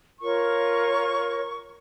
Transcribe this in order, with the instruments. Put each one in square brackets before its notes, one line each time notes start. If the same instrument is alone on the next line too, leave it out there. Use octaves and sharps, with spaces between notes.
[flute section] F4 A#4 C#5 C#6